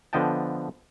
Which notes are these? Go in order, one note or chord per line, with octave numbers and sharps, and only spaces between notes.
D3 F3 B3 D#5 G5 A5